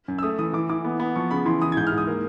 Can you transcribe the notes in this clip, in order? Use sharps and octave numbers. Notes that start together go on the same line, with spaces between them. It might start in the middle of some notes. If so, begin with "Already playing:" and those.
F#2
E6
A3 D#6
E3 D#6
E3 D6
E3 D6
B3
B3
F3 C#6
C#3 B5
E3 C6
E3 D#6
G#6
G#2 G6
F6
G#2
D#6
A#3